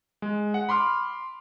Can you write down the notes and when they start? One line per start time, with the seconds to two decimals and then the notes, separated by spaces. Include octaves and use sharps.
0.22 G#3
0.54 F#5
0.69 B5 C6 D6 F6